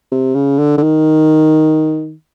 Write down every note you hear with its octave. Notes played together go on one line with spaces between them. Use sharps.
C3
C#3
D3
D3
D#3